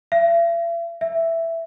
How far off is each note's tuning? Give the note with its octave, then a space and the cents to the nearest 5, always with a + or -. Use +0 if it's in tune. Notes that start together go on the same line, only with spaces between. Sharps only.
E5 +45
E5 +5